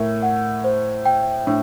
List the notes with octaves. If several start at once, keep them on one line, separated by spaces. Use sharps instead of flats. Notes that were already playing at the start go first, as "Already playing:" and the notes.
Already playing: A2 A#4
F#5
C5
G5
A2 D4